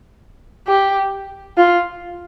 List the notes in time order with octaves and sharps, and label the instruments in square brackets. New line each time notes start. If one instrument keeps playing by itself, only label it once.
[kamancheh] G4
F4